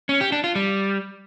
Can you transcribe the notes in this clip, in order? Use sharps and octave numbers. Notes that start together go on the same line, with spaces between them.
C#4
G4
D4
F4
G3